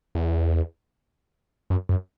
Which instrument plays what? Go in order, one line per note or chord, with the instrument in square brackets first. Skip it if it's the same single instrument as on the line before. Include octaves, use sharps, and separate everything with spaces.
[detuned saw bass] E2
F#2
F#2